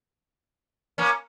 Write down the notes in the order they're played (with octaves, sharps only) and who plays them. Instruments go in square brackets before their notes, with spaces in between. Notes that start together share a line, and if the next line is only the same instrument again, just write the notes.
[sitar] A#3 C#4